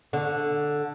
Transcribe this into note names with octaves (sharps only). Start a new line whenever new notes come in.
D3